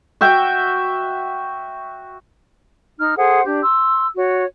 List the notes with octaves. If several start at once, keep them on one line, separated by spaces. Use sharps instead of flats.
F#4 E5 G5
D#4 F6
G#4 A4 C5 F#5
D4 G4
C6 E6
F#4 C#5